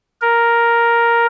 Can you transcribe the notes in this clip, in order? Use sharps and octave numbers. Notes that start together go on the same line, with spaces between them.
A#4